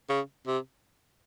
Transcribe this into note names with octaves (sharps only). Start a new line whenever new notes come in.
C#3
C3